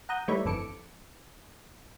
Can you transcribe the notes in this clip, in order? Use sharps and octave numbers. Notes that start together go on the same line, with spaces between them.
F#5 A#5 D#6 G6
E3 G3 A3 D#4 E4 C#5
G1 F2 E3 A4 D6 C#7